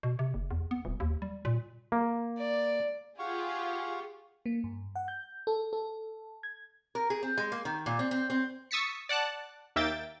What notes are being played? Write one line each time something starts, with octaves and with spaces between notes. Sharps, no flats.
B2
C3
F#1
E2
B3
D#1
D#2
G3
A#2
A#3
D5
F4 G4 G#4 F5 F#5 C#6
A#3
G2
F#5
G6
A4
A4
G#6
A#4
G#4
C4
G#3
A#3
D#3
A#2
C4
C4
C4
C#6 D#6 E6 A6 B6 C#7
D5 F#5 A5 F#6
D#2 A#3 E5 G5 A6